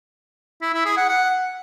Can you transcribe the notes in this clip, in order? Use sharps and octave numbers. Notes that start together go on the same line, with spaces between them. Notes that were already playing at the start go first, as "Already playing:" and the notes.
E4
E4
G#4
F#5
F#5